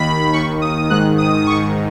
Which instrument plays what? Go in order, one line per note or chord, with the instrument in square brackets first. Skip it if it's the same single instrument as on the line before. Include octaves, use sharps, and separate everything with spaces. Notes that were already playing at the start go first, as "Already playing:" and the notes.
Already playing: [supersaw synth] D#2 D#3 B5
D#2 D#3 C#6
D#6
G#2 D#3 F#6
D#6
G#2 D#3 C#6